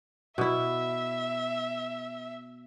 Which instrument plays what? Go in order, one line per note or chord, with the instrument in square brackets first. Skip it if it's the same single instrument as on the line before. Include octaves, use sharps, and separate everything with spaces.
[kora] B2 E4 [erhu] E5